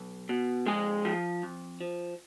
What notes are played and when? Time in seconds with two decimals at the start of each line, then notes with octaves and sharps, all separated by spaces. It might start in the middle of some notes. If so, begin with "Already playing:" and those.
Already playing: B1
0.29 B2
0.67 F2 G#3 G#4
1.05 F3
1.43 F2
1.81 F3